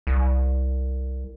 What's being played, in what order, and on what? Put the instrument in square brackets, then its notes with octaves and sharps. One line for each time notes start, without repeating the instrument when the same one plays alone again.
[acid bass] C2